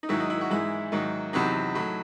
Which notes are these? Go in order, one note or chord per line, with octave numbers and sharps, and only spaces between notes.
D#4
G#2 D#3 F#3 E4
D#4
E4
F#4
G#2 E3 G#3 E4
G#2 D#3 F#3
E2 C3 F#3 D#4
A2 F#3